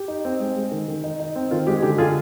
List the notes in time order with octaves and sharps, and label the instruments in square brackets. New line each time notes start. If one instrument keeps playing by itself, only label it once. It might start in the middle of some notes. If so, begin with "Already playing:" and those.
Already playing: [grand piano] G4
D#4
C4
G#3
G#3
D#3
D#3
D#4
D#4
C4
D#3 F4
G#3 G4
G#4
D3 G4
D3 F4 G#4